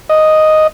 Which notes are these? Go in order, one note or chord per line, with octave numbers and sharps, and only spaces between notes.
D#5